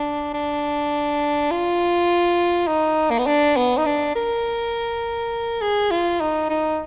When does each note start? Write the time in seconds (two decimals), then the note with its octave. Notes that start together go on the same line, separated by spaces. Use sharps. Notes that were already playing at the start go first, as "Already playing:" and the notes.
Already playing: D4
0.34 D4
1.51 F4
2.68 D#4
3.10 A#3
3.19 B3
3.27 D4
3.57 B3
3.78 D#4
3.86 D4
4.15 A#4
5.61 G#4
5.91 F4
6.21 D#4
6.50 D#4